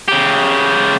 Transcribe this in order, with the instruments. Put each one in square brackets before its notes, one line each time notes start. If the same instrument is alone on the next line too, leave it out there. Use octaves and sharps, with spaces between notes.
[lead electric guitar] C#3 G4